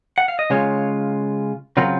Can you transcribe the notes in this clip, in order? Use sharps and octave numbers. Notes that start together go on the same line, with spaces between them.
F#5
F5
D#5
C#3 G#3 C#4 F4 C#5
C#3 F#3 C4 F4 A#4